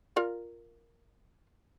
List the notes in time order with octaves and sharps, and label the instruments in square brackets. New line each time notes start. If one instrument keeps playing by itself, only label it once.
[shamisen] F4 A#4 D5